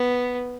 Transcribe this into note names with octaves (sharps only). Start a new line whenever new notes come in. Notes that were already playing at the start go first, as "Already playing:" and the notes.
Already playing: B3